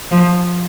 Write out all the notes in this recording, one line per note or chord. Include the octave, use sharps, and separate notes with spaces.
F3